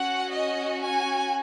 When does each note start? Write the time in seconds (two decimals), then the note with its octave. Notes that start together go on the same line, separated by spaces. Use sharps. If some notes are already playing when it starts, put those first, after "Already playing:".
Already playing: C#4 F#4 F#5
0.33 D#5
0.84 G#5